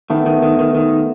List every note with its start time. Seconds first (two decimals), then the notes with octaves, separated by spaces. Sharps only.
0.10 D#3 A3 B3
0.26 D#3
0.42 D#3
0.59 D#3
0.75 D#3